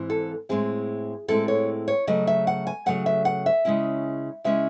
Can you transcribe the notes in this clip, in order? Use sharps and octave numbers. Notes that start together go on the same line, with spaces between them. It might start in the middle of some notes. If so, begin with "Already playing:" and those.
Already playing: G#2 E3 C4 E4
A4
A2 G#3 C4 E4 G#4
A2 G#3 C4 E4 A4
C#5
C#5
C#3 F#3 A3 D#5
E5
F#5
G#5
C#3 F#3 A3 F#5
E5
F#5
E5
C#3 G#3 C#4 E4
C#3 G#3 C#4 E4 E5